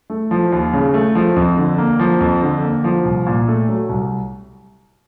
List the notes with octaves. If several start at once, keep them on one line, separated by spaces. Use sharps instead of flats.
A3
F3
D#2
C#3
A3
F3
F2
D3
A#3
F3
F2
D3
A#3
F3
C2
A#2
A3
F#3
C2